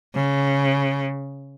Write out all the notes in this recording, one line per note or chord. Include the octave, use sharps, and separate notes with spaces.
C#3